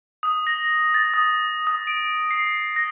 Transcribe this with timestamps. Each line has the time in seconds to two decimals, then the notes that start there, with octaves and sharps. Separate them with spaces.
0.23 D#6
0.47 A#6
0.94 A6
1.14 D#6
1.67 D#6
1.87 D7
2.31 C7
2.76 A#6